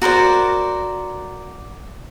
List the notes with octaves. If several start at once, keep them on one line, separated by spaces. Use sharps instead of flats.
F#4 A#4 C5 D5